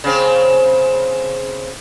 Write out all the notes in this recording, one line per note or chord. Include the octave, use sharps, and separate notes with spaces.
C#3 C4